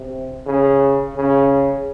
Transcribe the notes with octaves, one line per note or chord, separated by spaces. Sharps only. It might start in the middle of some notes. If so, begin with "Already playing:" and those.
Already playing: C3
C#3
C#3